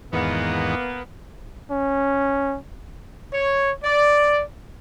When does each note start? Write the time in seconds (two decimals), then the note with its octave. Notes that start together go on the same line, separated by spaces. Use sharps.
0.13 E2 G#2 D#3 A#3 B3
1.71 C#4
3.33 C#5
3.83 D5